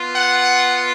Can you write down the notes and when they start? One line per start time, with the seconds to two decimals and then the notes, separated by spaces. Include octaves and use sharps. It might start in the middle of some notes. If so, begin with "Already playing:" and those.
Already playing: B3 F4
0.13 F#5